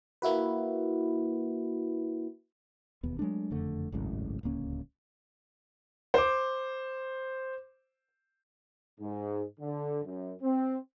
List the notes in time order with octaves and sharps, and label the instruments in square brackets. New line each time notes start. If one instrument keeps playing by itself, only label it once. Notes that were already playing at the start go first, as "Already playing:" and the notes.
[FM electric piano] A#3 E4 F#4 B4
[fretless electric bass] E1 D#2 B3
F#3 G#3 A3 D4
F#1 F2 D3 A3
G#1 C#2 F#2 A2
D1 C#2 A#3 C#4
[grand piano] C5 D6
[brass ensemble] G#2
D3
F#2
C4